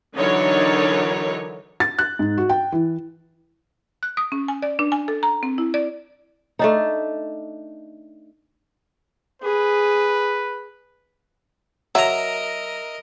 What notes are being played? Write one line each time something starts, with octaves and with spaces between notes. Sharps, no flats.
D3 E3 F#3 D#4 A#4 C#5
A6
F#6
G#2
F#4
G5
E3
F#6
D#6
C#4
G#5
D5
D4
G#5
A4
A#5
C4
E4
D5
A3 D4 D#4
G#4 B4
F#3 A#4 D#5 E5 A#5